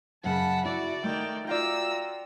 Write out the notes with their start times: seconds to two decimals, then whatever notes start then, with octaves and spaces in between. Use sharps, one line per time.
0.24 F#2 C#3 F#5 A5 B5
0.65 E4 F#4 D5 E5
1.04 D#3 A3 G5
1.47 F4 F#4 D5 F5 G5 A#5 E6